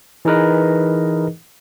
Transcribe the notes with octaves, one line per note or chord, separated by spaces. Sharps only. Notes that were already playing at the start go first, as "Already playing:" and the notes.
E3 D#4 G#4 A#4 B4 D#5